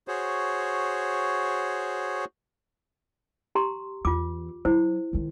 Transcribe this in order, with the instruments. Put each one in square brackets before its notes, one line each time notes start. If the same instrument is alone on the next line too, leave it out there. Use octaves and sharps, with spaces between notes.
[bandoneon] F#4 G#4 C5 C#5
[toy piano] G4 A#5 C6
[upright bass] E2 [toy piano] F4 D6
[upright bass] F#3 [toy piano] E4 C5
[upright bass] D#3 G#3